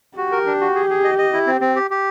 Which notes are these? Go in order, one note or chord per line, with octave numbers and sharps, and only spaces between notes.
F#4 G4
A#4
D4
F#4
G#4
G#4
D#5
D#5
E4
C4
C4
G4
G4